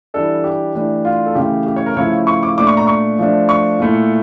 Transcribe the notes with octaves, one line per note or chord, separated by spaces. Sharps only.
E3 G3 D4 A4
G4
E3 A3 D4
F4
A4
C#3 E3 A3 G4
G4
C#5
A#4
C#3 F3 A3 E4 C#5
C#6
D6
A#2 A3 D4 D6
C#6
A#5
C#6
F3 A3 D4
C#6
A#2 A3 E4